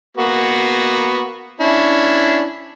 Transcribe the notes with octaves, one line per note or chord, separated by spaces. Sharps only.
A#3 B3 F#4
C#4 D4 E4